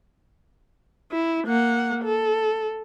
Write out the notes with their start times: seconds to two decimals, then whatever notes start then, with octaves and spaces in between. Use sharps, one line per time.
1.12 E4
1.47 A#3 F#5
2.04 A4